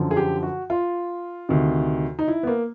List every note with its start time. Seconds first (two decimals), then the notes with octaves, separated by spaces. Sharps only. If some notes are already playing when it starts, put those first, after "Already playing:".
Already playing: F#2 D3 F3
0.11 G#4
0.17 G4
0.43 F#4
0.70 F4
1.49 D2 C3 D#3
2.19 D#4
2.28 E4
2.43 B3
2.47 A#3